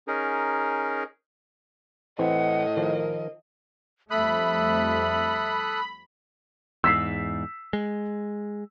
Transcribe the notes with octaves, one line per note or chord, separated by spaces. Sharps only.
C#4 D#4 G#4 A#4
A2 E3 C4 D#5 F#5
D#3 F3 A#4
F2 G3 A3 A4 E5 B5 D#6 F#6
E2 G#2 E6 B6 C7
G#3